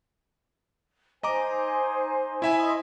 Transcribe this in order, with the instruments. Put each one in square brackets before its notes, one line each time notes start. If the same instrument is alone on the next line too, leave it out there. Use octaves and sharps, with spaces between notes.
[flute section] D#4 C5 G#5 [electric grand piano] D#5 A#5 D6
[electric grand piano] E4 E5 G#5
[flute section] D#5 C6 D#6